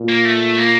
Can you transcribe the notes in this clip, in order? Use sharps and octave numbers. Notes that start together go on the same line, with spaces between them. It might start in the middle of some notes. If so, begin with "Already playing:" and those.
Already playing: A#2
A#3
A3
A#3